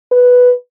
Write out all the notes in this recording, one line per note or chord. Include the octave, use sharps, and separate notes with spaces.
B4